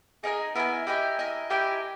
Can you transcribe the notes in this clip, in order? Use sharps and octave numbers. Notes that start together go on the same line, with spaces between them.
D#4 G#4 A#4 D#5 G#5
B3 E4 A#4 D#5 G#5
E4 G4 A#4 D#5 G#5
E4 A#4 D#5 G#5
E4 G4 A#4 D#5 G#5